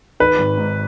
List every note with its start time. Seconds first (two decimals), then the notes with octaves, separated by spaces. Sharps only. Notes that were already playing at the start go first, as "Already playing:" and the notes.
0.20 D#3 B4
0.39 G#1
0.58 G#2